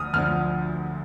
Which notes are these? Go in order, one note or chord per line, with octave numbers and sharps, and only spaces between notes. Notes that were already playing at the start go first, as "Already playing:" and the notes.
Already playing: D2 D3 F3 D#6 F6
D2 D3 F3 F6